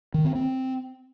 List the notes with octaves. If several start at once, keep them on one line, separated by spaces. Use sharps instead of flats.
D#3
C4
C4